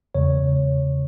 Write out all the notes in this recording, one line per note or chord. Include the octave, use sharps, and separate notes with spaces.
E2 C#3 G#3 C#5